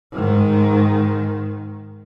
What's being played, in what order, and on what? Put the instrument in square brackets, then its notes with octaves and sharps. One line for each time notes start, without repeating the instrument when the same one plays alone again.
[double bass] G#2 D#3